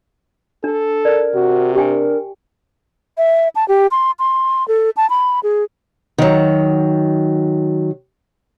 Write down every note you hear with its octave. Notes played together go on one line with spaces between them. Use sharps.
D4 A4
A#4 D5
C3 F#4
D4 G4 G5 G#5
E5
A5
G4
C6
C6
A4
A5
B5
G#4
D#3 F#3